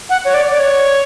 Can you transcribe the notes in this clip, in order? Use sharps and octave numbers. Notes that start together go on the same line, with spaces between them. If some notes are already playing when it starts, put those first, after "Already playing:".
F#5
C#5
D5
D5
C#5